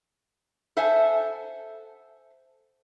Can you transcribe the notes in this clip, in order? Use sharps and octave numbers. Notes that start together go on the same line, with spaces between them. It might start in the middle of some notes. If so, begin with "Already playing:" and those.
A4 C5 E5 F#5 G#5 A5